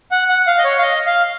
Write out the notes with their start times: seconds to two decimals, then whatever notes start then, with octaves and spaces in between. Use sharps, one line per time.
0.11 F#5
0.29 F#5
0.47 F5
0.58 D#5
0.64 C#5
0.78 F5
0.82 D#5
1.06 F5